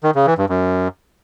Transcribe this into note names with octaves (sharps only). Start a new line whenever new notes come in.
D#3
C#3
E3
G2
F#2